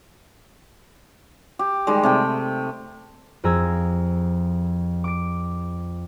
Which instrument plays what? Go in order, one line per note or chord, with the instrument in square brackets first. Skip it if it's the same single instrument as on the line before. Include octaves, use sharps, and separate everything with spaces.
[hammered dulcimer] G4
D#3 G3 G#3
C3 A3 G5
[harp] F2 G#4 A#5 E6 G#6
D6 D7